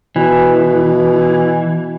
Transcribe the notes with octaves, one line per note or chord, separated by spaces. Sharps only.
B2 E3